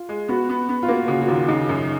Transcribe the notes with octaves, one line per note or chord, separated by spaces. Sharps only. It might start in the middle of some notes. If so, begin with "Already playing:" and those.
Already playing: F4
G#3
B3 F#4
B3
B3
F4
A#3 F#4
C#3 F#4
F#4
D#2 F4
C#3 D#4
F#2